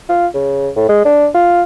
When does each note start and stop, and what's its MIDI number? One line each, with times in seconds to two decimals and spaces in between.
0.09 0.27 65
0.34 0.69 49
0.76 0.84 45
0.89 1.00 56
1.05 1.27 62
1.34 1.63 65